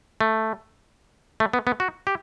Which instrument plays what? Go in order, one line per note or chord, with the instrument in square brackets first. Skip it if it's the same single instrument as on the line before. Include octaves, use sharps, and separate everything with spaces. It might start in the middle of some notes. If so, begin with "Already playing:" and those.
[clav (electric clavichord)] A3
A3
B3
B3
F#4
G4